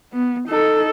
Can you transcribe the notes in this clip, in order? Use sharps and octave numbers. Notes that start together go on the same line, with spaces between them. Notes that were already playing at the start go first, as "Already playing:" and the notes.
B3
D#4 A4